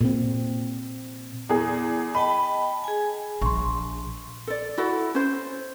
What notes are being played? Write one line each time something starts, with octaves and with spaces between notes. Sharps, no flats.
A#2 C4
E2 G#4
D#5 G5 A5 B5
G#4 G#5
A#1 C6 C#6
A4 D5
E4 F#4 A4
C#4 C5